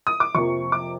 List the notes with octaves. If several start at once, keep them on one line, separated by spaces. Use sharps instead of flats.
D#6
D6
F2 C3 F3 A#3 C#6
D6